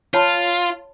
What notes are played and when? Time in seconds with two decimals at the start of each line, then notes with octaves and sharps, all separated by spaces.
0.14 F4 C#5 A5 B5